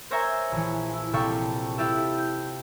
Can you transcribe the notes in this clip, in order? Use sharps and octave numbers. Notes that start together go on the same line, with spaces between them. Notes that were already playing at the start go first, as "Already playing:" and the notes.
A#4 C5 C#5 E5 G#5 A#5
A#1 E3
E4
A#1 C3 A4 F5 G5 C#6
E4 F4 G4 A4 E5
G6